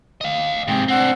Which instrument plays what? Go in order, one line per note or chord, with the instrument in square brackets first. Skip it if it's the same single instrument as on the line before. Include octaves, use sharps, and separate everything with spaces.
[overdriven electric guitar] D#5 F5
[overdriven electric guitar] G#2 C3 [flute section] G5
[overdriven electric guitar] C4 D4 [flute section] F#5 E6